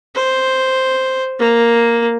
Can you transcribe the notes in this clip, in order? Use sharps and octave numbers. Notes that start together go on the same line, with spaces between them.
C5
A#3